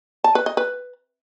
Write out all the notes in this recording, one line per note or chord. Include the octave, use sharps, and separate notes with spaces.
A5
B4
D#5
B4